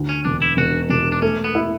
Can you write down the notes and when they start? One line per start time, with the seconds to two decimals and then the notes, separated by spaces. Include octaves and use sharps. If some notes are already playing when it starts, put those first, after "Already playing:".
Already playing: D2
0.09 C#4
0.25 E1 D4
0.42 E4
0.57 E1 F#4
0.90 E1 D4
1.12 D4
1.22 A3 C#4
1.44 B3
1.55 E4